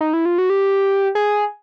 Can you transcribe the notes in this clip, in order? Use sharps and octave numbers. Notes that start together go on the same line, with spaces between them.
D#4
E4
F4
F#4
G4
G#4